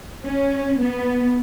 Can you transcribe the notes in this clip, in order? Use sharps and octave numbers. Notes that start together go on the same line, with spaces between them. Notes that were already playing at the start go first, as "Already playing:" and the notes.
C#4
B3